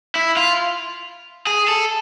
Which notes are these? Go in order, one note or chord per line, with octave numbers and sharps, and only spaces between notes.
E4
F4
G#4
A4